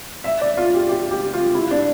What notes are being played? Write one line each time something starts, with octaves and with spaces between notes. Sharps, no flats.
E5
D5
F4
G4
G4
G4
F4
E4
D4